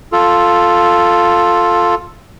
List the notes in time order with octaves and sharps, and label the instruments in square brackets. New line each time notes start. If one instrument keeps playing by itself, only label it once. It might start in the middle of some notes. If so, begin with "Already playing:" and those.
[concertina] F4 A4